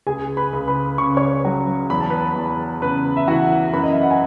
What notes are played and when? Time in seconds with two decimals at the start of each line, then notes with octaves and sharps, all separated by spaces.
0.07 C#2 G#4 G#5
0.37 B4 B5
0.53 C#2
0.68 B4 B5
0.98 C#3 C#6
1.17 C#5 C#6
1.45 F#3
1.90 E2 B5
2.00 A5
2.10 B4 B5
2.36 E2
2.81 C#3 B4 B5
3.16 E5
3.28 E3 F#4 F#5
3.73 F#2 B4 B5
3.83 D#5
3.92 E5
4.02 F#5
4.10 G#5